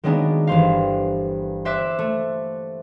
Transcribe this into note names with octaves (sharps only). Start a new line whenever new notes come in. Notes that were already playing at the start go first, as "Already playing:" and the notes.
D#3 F#3 G#3 A#3 B3 D4
G1 E3 C5 F5
C5 E5 D6 F#6
A3